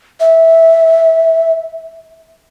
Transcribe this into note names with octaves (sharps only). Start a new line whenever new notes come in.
E5